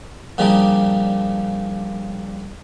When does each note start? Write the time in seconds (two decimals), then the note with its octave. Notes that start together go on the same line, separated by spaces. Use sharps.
0.38 A#2 C#3 F3 G3 D4 D#4